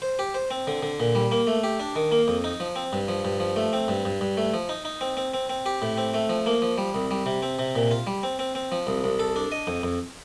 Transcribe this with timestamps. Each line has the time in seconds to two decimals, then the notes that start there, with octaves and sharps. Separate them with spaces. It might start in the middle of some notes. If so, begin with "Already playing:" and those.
0.02 C5
0.19 G4
0.34 C5
0.51 C4
0.67 D3
0.83 D3
1.00 A#2
1.15 G3
1.31 A#3
1.47 A3
1.64 G4
1.80 D4
1.96 D#3
2.11 A#3
2.28 F2
2.44 D#4
2.60 F3
2.76 C4
2.93 G2
3.08 F3
3.25 G2
3.40 F3
3.56 A3
3.73 C4
3.88 G2
4.05 G2
4.21 G2
4.37 A3
4.54 F3
4.69 D#4
4.85 D#4
5.01 C4
5.17 C4
5.34 C4
5.50 C4
5.66 G4
5.82 A2
5.98 C4
6.14 A3
6.29 F3
6.46 A#3
6.62 F3
6.78 G3
6.94 C2
7.11 G3
7.26 C3
7.43 C4
7.59 C3
7.75 A#2
7.91 F4
8.07 G3
8.23 C4
8.39 C4
8.55 C4
8.72 F3
8.87 C2
9.04 C2
9.20 A4
9.36 D4
9.52 D#5
9.67 F2
9.83 F2